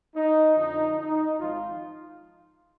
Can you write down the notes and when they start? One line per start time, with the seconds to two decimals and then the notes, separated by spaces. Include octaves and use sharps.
0.15 D#4
0.57 F2 D3 F3 D#4
0.98 D#4
1.39 G#1 G#2 F3 F4